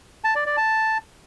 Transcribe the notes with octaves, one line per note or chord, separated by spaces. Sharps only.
A5
D5
D5
A5